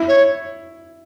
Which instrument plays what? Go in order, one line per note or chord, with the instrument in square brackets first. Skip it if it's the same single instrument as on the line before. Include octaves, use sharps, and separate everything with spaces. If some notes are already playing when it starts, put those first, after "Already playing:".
Already playing: [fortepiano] E4
[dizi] C#5